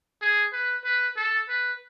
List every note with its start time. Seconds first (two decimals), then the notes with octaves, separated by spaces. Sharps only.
0.22 G#4
0.53 B4
0.85 B4
1.17 A4
1.49 B4